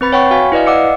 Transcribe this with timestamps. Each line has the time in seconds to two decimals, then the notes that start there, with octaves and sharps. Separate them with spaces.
0.01 C4 B4 B5 A6
0.12 C#5 F#5 G5 B5 C#6
0.31 F#4 F5 G#5
0.52 E4 B4 D5 D#5 F5
0.67 D5 D#5 F#5 D6 E6 C#7